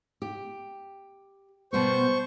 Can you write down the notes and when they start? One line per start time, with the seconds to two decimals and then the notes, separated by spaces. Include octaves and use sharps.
0.22 G4
1.73 B2 G3 B3 C5 C#6